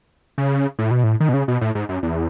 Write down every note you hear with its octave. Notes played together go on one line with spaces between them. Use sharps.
C#3
A2
B2
A2
D#3
B2
C#3
B2
A2
G#2
F#2
E2